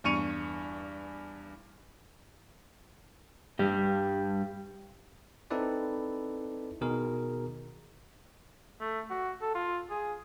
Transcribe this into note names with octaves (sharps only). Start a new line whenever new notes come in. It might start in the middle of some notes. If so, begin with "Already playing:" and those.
E2 G2 C#6 C#7 D#7 F7
G2 G3
C4 D#4 E4 A4 B4 D5
B2 D#3 G#4 A#4
A3
F#4
A4
F4
G#4